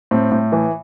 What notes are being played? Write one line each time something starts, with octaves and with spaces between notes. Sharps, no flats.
A2 C4
A2
E3